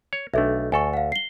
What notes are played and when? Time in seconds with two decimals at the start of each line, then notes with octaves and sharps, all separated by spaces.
0.13 C#5
0.34 B1 A3 D4 A4 E5
0.72 D2 A4 G#5 C#6
0.93 F5 F#5
1.12 C7 G7